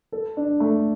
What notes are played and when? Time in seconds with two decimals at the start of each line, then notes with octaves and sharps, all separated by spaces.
0.12 A4
0.37 D4
0.60 A3